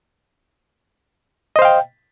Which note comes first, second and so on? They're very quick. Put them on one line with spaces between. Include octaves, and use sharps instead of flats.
D#5 C5 F5 G5